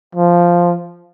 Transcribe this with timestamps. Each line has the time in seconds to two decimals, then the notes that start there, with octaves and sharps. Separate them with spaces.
0.15 F3